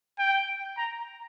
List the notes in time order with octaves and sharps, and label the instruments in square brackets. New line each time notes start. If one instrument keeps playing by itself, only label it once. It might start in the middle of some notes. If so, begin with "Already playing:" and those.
[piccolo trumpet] G5
A#5